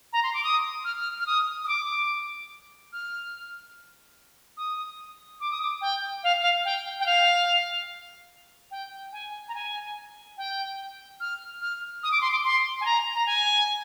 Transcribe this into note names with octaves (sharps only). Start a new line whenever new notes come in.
A#5
C6
D6
D#6
F6
F6
F6
D#6
D#6
D6
F6
D#6
D6
D#6
D6
G5
F5
F5
G5
G5
F5
G5
G#5
A#5
G#5
G5
F6
F6
D#6
D6
C6
D6
C6
G#5
A#5
A#5
G#5